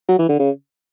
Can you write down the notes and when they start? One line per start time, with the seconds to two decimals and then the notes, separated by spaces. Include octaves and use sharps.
0.08 F#3
0.19 E3
0.29 D3
0.39 C#3